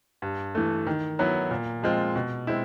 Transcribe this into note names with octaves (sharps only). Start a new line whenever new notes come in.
G2
E3 A3
D#3
F#3 B3 E4
A#2
F3 G#3 C4 F4
B2
G#3 C4 E4